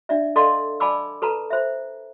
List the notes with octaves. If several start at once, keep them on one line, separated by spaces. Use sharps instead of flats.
D4 D5 E5
A4 D5 D#5 F5 A5 C6
D5 G#5 A5 B5 D6 E6
A4 B4 A5 A#5
C5 E5